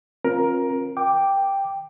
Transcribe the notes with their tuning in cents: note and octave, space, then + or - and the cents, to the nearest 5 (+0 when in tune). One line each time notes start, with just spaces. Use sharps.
C4 +45 F4 +20 A#4 +15
G5 +0 D6 +0